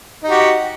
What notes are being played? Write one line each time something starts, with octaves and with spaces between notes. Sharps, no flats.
D#4 F#4 G4